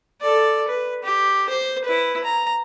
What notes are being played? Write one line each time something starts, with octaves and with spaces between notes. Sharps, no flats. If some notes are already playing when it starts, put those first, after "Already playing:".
A4 D5
B4
G4
C5
E4 B4
A#5